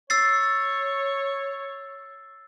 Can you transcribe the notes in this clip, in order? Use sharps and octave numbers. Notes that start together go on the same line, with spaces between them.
C#5 E6 A6 C7